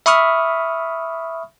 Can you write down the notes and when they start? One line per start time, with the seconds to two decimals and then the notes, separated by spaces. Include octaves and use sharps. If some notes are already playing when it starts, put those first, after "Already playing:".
0.06 E5 B5 C#6 D#6 F6